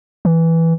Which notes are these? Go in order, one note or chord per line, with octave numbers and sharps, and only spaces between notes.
E3